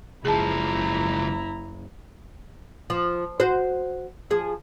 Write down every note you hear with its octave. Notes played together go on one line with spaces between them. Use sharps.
F#1 C#2 F3 E4 G#4 A5 A#5
F3
F#4 C5
F3 G#4